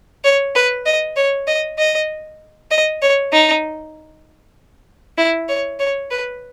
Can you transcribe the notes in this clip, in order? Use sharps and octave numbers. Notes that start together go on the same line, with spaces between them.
C#5
B4
D#5
C#5
D#5
D#5
D#5
C#5
D#4
E4
C#5
C#5
B4